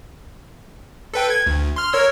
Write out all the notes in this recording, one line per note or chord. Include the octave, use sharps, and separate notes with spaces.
A4 B4 G5
G#6
D2
C6 F6
A#4 C#5 E6